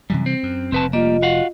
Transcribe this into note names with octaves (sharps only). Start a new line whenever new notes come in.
F#2 C3 E3 G3
C4
F#2
F1 C4 B4 A5
G3 A#3 F4 D#5
F#4 F5 F#5